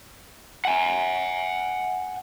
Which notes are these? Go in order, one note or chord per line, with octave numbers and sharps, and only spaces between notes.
F#5 G#5